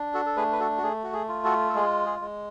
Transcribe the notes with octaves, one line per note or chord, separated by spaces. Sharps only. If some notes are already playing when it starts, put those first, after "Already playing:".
Already playing: D4
F#4 A4
A4
A3 G#4 B4
B4
F#4 A4
F#4
A3 G#4
F#4
G#4
F4
F#4 A4
A4
G#3 G#4
G#4
G#3